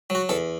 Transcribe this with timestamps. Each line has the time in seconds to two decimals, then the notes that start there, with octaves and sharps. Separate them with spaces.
0.10 F#3 F#4
0.29 E2 A4